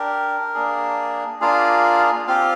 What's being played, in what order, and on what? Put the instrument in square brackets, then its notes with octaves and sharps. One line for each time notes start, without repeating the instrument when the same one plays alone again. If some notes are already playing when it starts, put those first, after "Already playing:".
Already playing: [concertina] D4 G4 A#4
A#3 D4 G#4
A#3 D4 F4 G#4 F5
C4 F4 G4 F5